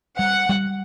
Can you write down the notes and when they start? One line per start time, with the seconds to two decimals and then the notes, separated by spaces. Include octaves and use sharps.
0.19 G3 F#5
0.49 G3